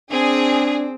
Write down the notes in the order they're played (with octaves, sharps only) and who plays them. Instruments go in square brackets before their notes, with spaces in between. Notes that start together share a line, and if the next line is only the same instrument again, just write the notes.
[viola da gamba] C4 [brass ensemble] D4 [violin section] G#4